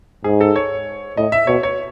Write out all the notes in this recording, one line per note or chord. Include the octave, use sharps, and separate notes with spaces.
G#2 G#4
A4
C#5
A2 D#5
E5
B2 C#5
C#5